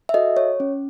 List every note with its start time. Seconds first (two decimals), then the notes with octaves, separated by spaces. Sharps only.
0.09 E5
0.14 F#4 A4 D#5
0.37 C#5
0.60 C#4